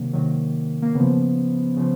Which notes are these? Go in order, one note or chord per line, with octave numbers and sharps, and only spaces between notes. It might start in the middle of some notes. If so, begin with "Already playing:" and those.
Already playing: C3 D#3 F#3 A#3
C3 D#3 F#3
A#3
C#3 F3 B3
C#3 F3